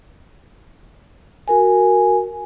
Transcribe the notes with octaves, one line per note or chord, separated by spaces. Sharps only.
F#4 A#4 G#5